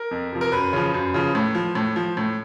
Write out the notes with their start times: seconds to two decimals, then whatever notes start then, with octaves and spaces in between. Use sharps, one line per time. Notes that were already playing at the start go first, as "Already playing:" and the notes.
Already playing: A#4
0.11 F2
0.33 C3 F3
0.41 A#4
0.52 F#2 B4
0.73 C#3 F3
0.94 F#2
1.14 C#3 F3
1.35 A2
1.55 F3
1.75 A2
1.96 F3
2.17 A2